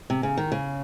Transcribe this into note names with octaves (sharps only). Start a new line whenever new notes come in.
C3
C#3
D#3
C#3